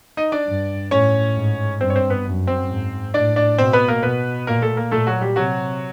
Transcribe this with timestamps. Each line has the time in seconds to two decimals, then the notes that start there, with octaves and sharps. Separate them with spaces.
0.17 D#4 D#5
0.32 D4 D5
0.47 G2
0.91 A2 C#4 C#5
1.35 G#2
1.81 G2 C4 C5
1.90 C#5
1.96 C4 C5
2.10 B3 B4
2.25 F#2
2.47 C4 C5
2.69 G#2
3.14 A2 D4 D5
3.36 D4 D5
3.58 B2 C4 C5
3.73 B3 B4
3.88 A#3 A#4
4.02 B2 B3 B4
4.47 A#2 A#3 A#4
4.62 A3 A4
4.77 A#3 A#4
4.91 A#2 A3 A4
5.07 F#3 F#4
5.21 G3 G4
5.36 C3 F#3 F#4